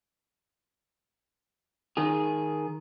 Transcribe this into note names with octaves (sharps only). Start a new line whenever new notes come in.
D#3 G#4